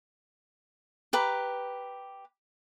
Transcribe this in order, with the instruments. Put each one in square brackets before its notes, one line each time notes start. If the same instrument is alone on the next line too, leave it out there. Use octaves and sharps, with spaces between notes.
[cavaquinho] G4 B4 A#5 D6